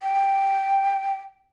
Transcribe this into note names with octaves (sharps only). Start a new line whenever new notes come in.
G5